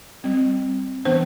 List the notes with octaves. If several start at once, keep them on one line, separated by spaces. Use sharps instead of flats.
G3 C4
E3 B3 D4 C5